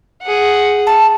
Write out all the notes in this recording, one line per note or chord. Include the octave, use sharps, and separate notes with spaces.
G#4 F#5
A5